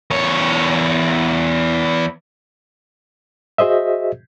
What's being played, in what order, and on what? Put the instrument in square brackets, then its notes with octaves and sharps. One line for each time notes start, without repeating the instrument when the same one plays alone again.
[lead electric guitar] E2 C#5
[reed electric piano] F#4 G#4 C5 D#5 E5